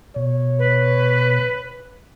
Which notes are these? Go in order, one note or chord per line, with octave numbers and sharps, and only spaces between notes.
B2 C#5
B4